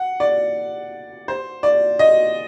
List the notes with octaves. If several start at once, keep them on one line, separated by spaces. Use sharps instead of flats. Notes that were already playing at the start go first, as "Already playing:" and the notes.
Already playing: F#5
D5
C5
D5
D#5